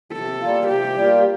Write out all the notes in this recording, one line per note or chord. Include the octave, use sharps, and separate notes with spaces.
C3 A4
G3 A#3 F4
C3 G4
G3 A#3 F4